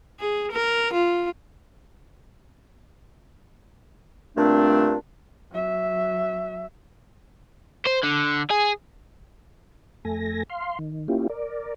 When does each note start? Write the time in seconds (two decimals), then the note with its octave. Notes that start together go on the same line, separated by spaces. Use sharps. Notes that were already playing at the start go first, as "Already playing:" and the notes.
0.20 G#4
0.52 A#4
0.93 F4
4.36 G2 A#2 A3 C4 D4
5.51 F#3 E5
7.87 C5
8.04 D3
8.51 G#4
10.05 F2 A3 A4 G#5 A#6
10.50 F5 C6
10.79 D#3
11.08 A#3 C#4 E4 F4 G4
11.29 A#4 D5